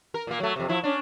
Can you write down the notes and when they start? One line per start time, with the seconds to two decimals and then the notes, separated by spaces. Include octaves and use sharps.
0.14 A#4
0.27 A#2 A#3
0.40 F#3 A3
0.56 F2 C3
0.69 F3 E4
0.83 C#4 D4